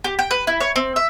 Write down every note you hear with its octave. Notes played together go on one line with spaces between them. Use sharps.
G4
G5
B4
E4
C#5
C4
E5